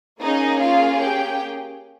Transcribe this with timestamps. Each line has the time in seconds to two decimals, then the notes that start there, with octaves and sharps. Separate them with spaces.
0.20 A#3 C#4 D#4 G#4 D#5
0.60 F4 F5
0.99 G4 G5